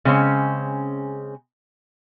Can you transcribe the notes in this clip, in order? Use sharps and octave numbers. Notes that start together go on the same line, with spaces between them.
C#3 G#3 C4 C#4